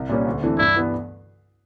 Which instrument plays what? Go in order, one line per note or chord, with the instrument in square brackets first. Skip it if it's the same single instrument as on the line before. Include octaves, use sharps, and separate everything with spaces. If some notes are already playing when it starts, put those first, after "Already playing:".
Already playing: [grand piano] C2
A#2 G3 A#3 C#4
D2
C3 E3 A3 D4
[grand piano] G2 [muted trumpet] E4
[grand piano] E3 G3 B3